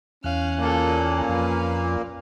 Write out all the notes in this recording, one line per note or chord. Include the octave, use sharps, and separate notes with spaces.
E2 C#4 F5 F#6
A#2 A#3 G#4 A4
F2 B4 F5